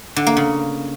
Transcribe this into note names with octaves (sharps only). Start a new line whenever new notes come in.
D3
A#3
C#3